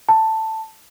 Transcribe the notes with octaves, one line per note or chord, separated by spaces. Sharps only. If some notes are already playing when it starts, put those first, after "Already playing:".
A5